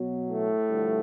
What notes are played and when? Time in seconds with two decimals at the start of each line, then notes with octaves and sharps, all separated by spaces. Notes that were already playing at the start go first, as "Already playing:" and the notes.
Already playing: B2 F#3
0.27 A2 A3
0.68 G2 D3 F3